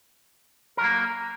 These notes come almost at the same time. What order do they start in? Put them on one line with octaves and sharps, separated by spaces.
A#4 F#3 A#3